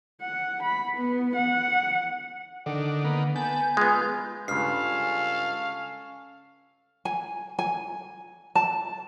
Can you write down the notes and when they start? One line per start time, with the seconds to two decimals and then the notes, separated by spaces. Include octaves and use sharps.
0.21 F#5
0.62 B5
0.96 B3
1.35 F#5
2.66 D3 D#3 D4 F#5
3.04 D#3 A#3 B3
3.36 B3 G#5 A5 G6
3.77 G#3 B3 F4
4.48 C#2 G2 C#4 A4 F5 F6 C7
7.05 G#5
7.59 G#5
8.55 A5